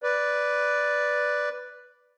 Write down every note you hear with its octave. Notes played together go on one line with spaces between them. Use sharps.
B4 D5